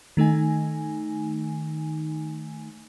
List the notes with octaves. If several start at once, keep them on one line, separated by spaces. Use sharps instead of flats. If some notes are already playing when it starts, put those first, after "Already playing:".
D#3 A3 D#4 G#5